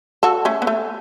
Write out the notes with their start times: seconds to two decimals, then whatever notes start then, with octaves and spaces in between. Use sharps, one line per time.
0.23 F#4 A4
0.45 A3 C#4
0.62 B3
0.67 A3